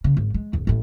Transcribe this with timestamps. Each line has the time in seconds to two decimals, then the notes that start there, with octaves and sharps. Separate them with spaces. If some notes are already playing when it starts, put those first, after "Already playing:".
0.04 C#3
0.17 G#1
0.34 G#3
0.53 D1 E2
0.67 A1 A2